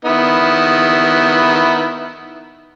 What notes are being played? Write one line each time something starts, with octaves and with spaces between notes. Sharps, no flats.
D#3 B3 E4